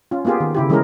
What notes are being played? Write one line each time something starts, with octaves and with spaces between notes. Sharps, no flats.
C#4 F4
A#3 B3 F4 G4 G#4
D#3
C#3 E4 G4
E3 G#3 A3 C#4 G#4 A#4